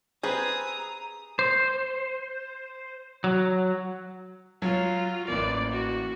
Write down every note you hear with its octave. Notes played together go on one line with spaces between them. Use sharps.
C4 G#4 B4 A#5 D#6
C5
F#3
F#3 F4
A1 E3 A#3 D5
F#4